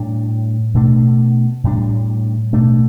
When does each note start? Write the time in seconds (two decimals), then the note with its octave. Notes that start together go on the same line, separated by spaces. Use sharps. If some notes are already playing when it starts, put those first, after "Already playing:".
Already playing: A2 G3 D4
0.74 B2 A3 D4
1.64 A2 G3 D4
2.53 B2 A3 D4